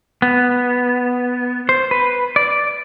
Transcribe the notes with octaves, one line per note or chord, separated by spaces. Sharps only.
B3
C5
B4
D5